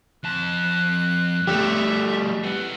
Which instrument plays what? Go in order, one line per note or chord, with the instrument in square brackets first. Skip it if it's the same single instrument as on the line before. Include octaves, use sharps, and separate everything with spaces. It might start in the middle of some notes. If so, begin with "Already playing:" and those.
[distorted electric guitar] F2 A5 [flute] F#6
[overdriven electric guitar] G3 A3 [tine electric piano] G4 [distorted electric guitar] E5
[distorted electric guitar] G#4 B4 [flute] F#5